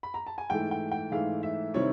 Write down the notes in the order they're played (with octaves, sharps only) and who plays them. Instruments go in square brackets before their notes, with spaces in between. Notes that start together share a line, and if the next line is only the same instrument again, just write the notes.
[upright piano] B5
A#5
A5
G#5
G#2 E3 A3 G5
G5
G5
G#2 E3 A3 F5
E5
C3 D#3 G3 C4 E4 C#5